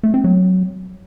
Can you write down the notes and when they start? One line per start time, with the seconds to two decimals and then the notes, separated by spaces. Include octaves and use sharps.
0.03 A3
0.14 C4
0.24 F#3